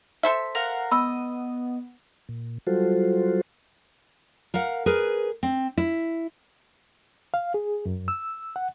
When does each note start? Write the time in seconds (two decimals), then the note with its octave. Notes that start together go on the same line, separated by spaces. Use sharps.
0.23 A4 C5 E5
0.55 A#4 F5 F#5
0.91 B3 D#5 B5 E6
2.29 A#2
2.67 F#3 G3 F4 F#4 A4 C5
4.54 A#4 F5 F#5
4.86 G#4 A#4 B4
5.43 C4
5.78 E4
7.34 F5
7.54 G#4
7.86 F#2
8.08 E6
8.56 F#5